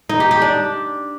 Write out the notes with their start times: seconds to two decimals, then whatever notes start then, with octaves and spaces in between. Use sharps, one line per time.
0.09 D#4
0.20 G4
0.31 G4
0.42 D4